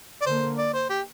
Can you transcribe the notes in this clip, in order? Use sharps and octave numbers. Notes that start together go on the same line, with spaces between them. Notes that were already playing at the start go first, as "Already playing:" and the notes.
D5
D3 A#3 C5
D5
C5
G4